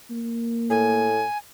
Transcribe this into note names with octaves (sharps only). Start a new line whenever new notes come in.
A#3
A2 G#5